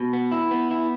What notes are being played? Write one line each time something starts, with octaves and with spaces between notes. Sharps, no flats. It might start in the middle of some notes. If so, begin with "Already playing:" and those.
Already playing: B2
B3
E4
B3
E4